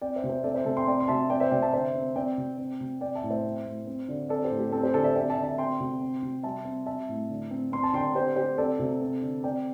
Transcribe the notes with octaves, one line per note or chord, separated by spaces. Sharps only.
C4 D5 G5
C5 E5
C3
C5 E5
C4 A4 D5
C5 E5
C3 A4
G5 C6
C4 D5 G5
C6
C3 E5 A5
C4 D5 G5
C5 E5
C3 D5 G5
E5 A5
D3 C5 E5
C4
C4 D5 G5
C3
C4
C3
C4 D5 G5
E5 A5
A2
C5 E5
C4
A2
C4
D3
C4 A4 D5
G4 C5
A2
G4
C4 A4
G4 C5
D3 A4 D5
C5 E5
C4 D5 G5
E5 A5
D3
E5 A5
C4 G5 C6
C3
C4
C3
G3 E5 A5
C4
C4 E5 A5
A2
D3
C4
C4 C6
A5
D3 G5 C6
C4 G4 C5
D3 G4 C5
C4 A4 D5
C3
C4
D3
C4 D5 G5